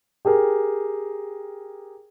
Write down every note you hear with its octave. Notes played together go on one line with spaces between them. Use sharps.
G4 G#4 A#4